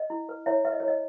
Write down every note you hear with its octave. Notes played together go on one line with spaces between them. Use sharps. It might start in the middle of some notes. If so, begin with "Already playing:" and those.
Already playing: D#5
E4
B4
E4 C#5 E5
B4 E5
D#5
C#5
E4 D#5